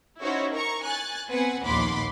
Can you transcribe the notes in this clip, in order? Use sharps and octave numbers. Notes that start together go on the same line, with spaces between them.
C#4 D#4 E4 F#4 C5 C#5
A#4 A#5 C#6
G#5 F#6 A6
B3 C4 B4 F#5 G#5
A#1 D#2 F#5 B5 C6 D6